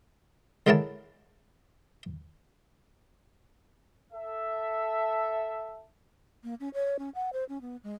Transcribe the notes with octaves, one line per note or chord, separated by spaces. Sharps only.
D3 G#3 E4 A#4 C#5 A5
A4 E5
A#3
C#4
C#5
C#4
F#5
C5
C#4
B3
G#3